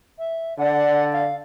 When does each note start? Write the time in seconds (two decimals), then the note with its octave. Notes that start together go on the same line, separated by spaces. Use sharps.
0.19 E5
0.58 D3 D5 F#5
1.13 F5